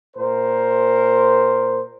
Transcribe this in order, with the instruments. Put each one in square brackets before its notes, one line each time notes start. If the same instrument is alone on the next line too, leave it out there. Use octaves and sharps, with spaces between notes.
[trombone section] A#2 A#4 C5